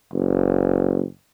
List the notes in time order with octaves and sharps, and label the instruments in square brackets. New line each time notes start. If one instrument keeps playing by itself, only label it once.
[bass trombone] F#1